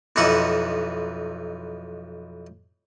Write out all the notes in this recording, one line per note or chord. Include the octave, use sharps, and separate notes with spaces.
B1 F2 E3 D#4 E5 F#5